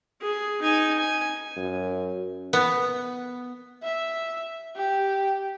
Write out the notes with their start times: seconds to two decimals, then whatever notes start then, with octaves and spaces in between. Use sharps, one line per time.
0.21 G#4
0.62 D#4 G#5
0.98 G#5
1.57 F#2
2.53 B3
3.83 E5
4.76 G4